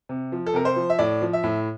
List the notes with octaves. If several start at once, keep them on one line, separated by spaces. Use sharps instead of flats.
C3
F3
A4
C3 A#4
C5
F3
E5
A2 D5
F3
E5
A2